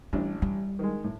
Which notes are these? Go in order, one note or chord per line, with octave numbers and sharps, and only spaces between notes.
A1 G3 D4
G3
D#3 G#3
A2